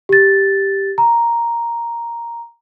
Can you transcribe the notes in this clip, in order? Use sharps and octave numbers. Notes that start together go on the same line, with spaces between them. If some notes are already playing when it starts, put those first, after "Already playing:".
G4 A6
A#5